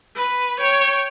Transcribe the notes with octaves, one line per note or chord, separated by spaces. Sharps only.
B4
C#5 G5